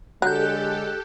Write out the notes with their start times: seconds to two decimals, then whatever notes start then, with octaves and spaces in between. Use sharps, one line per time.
0.22 D3 F#3 G#3 G4 A4 F#6 G6